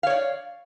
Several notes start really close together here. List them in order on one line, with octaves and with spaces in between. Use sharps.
F5 C#5 D5